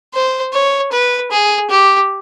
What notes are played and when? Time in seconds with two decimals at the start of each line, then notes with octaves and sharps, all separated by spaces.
0.14 C5
0.53 C#5
0.92 B4
1.31 G#4
1.70 G4